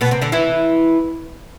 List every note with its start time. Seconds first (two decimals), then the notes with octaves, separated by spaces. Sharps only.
0.01 B2 B3
0.11 C3 C4
0.21 D3 D4
0.32 E3 E4